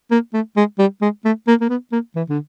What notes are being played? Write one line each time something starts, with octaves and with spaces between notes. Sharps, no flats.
A#3
A3
G#3
G3
G#3
A3
A#3
A#3
B3
A#3
E3
D3